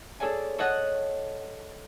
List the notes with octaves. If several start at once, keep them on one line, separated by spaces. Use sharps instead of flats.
G#4 A4 C#5 D5 G#5
A4 C#5 D#5 F#5